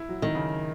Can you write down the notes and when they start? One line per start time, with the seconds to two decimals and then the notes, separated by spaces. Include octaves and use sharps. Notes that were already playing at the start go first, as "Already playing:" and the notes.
Already playing: E4
0.09 F#3
0.22 D#3
0.35 C#3